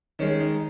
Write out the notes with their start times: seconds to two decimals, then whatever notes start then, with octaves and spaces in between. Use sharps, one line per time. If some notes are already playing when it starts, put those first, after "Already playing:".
0.19 D#3 G#3 C#4
0.41 D#4